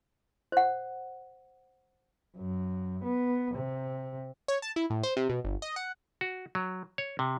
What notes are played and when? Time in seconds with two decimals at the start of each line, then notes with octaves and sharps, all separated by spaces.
0.52 C5 F#5
2.37 F#2
3.04 B3
3.55 C3
4.48 C#5
4.62 A5
4.76 E4
4.90 A2
5.03 C5
5.16 C3
5.29 B2
5.44 G1
5.62 D#5
5.76 F#5
6.21 F#4
6.55 F#3
6.98 C#5
7.19 C3